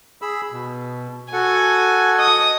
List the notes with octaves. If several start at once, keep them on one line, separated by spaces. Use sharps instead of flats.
G#4 B5 E6
B2
F#4 A4 F#5 G#5
D#5 D#6